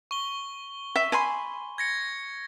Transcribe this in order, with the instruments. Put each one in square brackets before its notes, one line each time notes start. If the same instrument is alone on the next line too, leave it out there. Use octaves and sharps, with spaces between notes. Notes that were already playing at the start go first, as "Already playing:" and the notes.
[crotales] C#6 G7
[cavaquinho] E5
G#5 B5 C6
[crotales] G#6 A#6 C#7